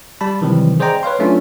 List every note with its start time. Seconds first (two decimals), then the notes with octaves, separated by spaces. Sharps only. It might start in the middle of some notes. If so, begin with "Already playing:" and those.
0.21 G3 A5 B5
0.41 C3 D#3 E3 F#3 G3 C4
0.80 G#4 C5 D5 D#5 G5 A#5
1.03 B4 C#5 F5 C6
1.19 F#3 A3 C#4 D4 F4